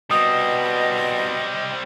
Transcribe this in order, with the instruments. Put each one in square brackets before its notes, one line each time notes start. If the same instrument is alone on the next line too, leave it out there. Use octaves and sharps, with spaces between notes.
[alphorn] B2 [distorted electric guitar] G3 C4 [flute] D#5 [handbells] D#6